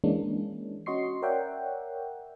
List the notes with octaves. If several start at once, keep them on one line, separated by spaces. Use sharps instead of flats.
E3 G#3 A#3 C#4 D4
C#4 F#4 D#5 C6 C#6 C7
A#4 C#5 D5 E5 F#5 G5